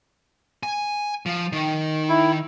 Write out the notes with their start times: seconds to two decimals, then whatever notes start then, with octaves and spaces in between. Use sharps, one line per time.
0.63 G#5
1.26 F3
1.52 D#3
2.09 E4